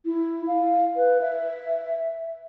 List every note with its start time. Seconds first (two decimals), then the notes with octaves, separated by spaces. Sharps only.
0.05 E4
0.47 F5
0.96 B4
1.21 E5